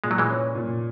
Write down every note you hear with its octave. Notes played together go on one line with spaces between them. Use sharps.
A#2 G#3
F#3
E3 G#3
C#4
A#2